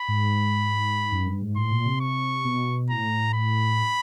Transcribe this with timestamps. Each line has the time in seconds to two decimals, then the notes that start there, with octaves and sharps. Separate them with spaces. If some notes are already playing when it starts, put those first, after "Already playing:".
Already playing: B5
0.08 G#2
1.12 F#2
1.26 G2
1.42 G#2
1.56 A2 C6
1.71 A#2
1.85 C3
2.00 C#6
2.45 B2
2.89 A2 A#5
3.34 B5